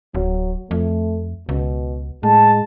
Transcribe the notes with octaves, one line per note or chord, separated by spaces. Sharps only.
D1 F#3
F2 A3
C#2 B2
A2 G#3 A5